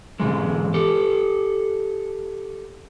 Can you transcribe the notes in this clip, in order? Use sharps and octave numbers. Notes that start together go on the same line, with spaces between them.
G#2 B2 D3 E3 G#3
G4 A4